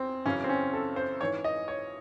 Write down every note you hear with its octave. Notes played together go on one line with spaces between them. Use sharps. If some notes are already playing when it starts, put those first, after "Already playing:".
Already playing: E2 C4
F#2 C#3 E3 C#4
C4
C#4
A4
C5
G#2 E3 C#5
D#5
C#5